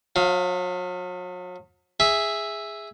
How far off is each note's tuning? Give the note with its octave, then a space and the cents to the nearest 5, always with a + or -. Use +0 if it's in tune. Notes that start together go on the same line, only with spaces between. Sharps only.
F#3 -40 F5 -5
G#4 -5 E5 +0